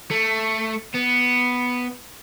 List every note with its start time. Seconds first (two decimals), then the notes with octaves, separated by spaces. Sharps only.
0.11 A3
0.95 B3